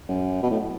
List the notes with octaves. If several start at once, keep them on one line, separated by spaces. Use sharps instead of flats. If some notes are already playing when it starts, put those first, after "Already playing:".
F#2
B2
A2